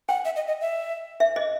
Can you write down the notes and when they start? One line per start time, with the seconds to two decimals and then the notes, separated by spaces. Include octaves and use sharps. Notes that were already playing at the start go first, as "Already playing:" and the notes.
0.09 F#5 G5
0.25 E5
0.36 D#5
0.48 D#5
0.61 E5
1.20 E5
1.36 D#5